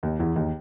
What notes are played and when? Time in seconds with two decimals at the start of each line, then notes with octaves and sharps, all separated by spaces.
0.03 D#2 D#3
0.19 E2 E3
0.36 D#2 D#3